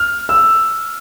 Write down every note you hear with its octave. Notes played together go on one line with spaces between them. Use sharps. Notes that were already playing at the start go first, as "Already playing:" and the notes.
Already playing: F6
E6